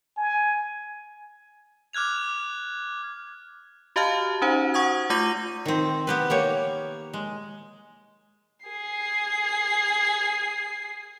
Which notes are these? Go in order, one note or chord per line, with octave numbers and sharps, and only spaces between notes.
G#5
D6 F6 F#6 G#6 F7
F#4 G4 D#5 F5 A5 F6
C#4 D#4 F#4 C5 F#5
F#5 C#6 D#6 G#6
A3 F4 D6 G6 A#6 D#7
D#3 C4
B3 G4 B4
A#3 G4 C#5
G#3
G#4 C7